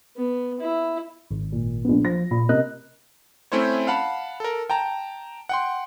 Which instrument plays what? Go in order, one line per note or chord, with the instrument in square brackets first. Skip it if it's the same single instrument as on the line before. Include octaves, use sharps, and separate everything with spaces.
[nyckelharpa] B3
E4
[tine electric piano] G#1
[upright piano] A#2
A#1 B3
[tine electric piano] F3 [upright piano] A#6
[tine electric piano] A#2 [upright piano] B5
[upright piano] C3 [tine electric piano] A#4 D#5 F#6
[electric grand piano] A3 C4 C#4 E4 C5 C#5
F5 F#5 A5 B5
A4 A#4
G5 A5 A#5
F#5 G5 C6